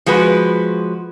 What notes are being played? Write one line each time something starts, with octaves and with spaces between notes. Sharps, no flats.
F3 G#3 F#4 B4